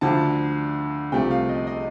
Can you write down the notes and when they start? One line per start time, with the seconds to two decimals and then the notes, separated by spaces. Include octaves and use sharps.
0.01 D2 D3 F3 A5
1.12 C2 C3 F3 A3 G5
1.31 F5
1.49 D#5
1.67 D#5